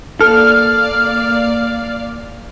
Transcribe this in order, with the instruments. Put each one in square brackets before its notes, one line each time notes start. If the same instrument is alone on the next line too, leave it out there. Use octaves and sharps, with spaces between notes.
[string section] A#3 D5 F5 [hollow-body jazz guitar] A4 [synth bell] F6